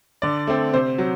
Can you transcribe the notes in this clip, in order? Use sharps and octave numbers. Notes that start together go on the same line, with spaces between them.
D3 D5
A3 C4
C3 C5
F#3